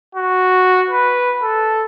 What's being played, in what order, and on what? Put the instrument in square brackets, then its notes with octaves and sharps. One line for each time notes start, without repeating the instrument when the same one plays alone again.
[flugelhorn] F#4
B4
A4